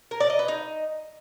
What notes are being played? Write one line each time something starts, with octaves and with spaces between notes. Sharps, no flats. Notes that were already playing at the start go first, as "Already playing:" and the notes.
A#4
D5
D#5
B4
D#4